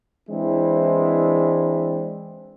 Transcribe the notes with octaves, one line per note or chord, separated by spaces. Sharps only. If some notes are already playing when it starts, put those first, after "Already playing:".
E3 G#3 C4 D4 E4